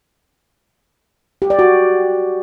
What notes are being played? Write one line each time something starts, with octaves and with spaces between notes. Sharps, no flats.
G4
D5
F#4